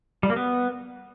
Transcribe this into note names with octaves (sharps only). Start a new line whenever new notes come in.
G3
A#3
B3